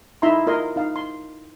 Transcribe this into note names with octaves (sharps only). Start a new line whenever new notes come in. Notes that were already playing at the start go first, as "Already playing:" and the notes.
D#4 E4 E5 A#5 C6
F4 A#4 D#5 C6
D#4 F5
C6